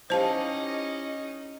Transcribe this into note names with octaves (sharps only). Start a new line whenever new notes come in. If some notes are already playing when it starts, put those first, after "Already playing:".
C#4 D#4 E4 G4 C5 D#5 F5 A5